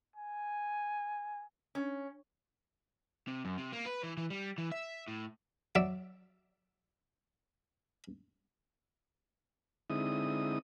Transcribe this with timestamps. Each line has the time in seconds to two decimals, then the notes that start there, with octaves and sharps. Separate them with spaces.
0.16 G#5
1.75 C#4
3.28 C3
3.45 F#2
3.58 C3
3.72 A#3
3.86 B4
4.03 E3
4.17 E3
4.30 G3
4.58 E3
4.72 E5
5.08 A2
5.75 F#3 D5 E5
9.90 D3 G#3 C4 D#4 E4 D#6